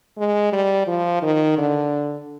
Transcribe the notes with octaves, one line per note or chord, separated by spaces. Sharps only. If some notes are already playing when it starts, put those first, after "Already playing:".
G#3
G3
F3
D#3
D3